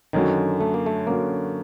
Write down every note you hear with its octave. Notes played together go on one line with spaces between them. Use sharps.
F#2 D3 D#3 F#3
A3
A#3
A3
F#2 D3 F#3 A#3